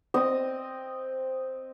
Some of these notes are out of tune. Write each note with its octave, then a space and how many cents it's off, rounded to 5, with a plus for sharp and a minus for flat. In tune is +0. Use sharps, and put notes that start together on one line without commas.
C4 +0 D#5 -5 D#6 +0